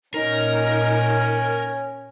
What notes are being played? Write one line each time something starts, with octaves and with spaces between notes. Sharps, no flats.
A#2 C#4 D#4 A#4